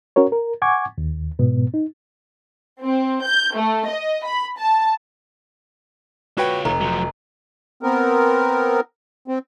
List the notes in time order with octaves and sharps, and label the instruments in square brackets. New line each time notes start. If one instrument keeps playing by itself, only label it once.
[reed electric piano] C#4 F#4 A#4 C#5
A#4
F#5 G#5 C#6 D6 G#6
D#2
G#2 B2 B3
D#4
[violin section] C4
G6
A3
D#5
B5
A5
[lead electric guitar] F4 C#5 [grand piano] F#4 B4 G5
[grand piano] F1 [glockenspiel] A#5
[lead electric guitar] F3 F#3
[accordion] B3 C4 A#4
C4